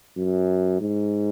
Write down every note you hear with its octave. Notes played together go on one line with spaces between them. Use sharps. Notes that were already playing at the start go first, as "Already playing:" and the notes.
F#2
G#2